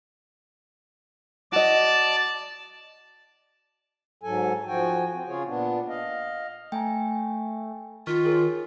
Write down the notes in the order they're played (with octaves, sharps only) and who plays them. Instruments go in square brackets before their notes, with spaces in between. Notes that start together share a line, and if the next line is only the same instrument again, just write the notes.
[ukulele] F#4 D#5 [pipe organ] D5 A5
[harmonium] G#2 F#3 A4 G#5
F3 F#4 G5 G#5
C4
C#3 F4 G#4 C#5
A#2 B3 D4
D#5 F5
[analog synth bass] A3 [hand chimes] G5 G#5 A#5
[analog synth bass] D#3 [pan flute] F4 [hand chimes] C#6 F6 B6
[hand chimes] G#4 A#4 C#5